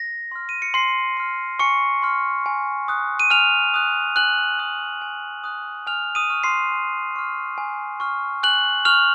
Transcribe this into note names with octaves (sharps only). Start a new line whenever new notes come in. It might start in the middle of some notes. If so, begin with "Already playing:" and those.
Already playing: A#6
C6 F6
D#7
C#7
G#5 C6 C7
C6 F6
G#5 C#6 C#7
C6 F6
G#5
D#6 F#6
D#7
G#5 F6 F7
D#6 F#6
G#5 F#6 F#7
D#6 F#6
G#5
D#6 F#6
G#5 F6 F7
D#6 D#7
C#6 F6
C6 C7
G#5
C#6 F6
G#5
C#6 F6
G#5 F#6 F#7
C#6 F6 F7